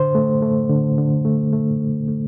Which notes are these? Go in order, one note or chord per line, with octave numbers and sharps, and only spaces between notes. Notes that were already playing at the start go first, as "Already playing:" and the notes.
Already playing: D3 C5
A3
A3
D3
D3
A3
A3
A3
A3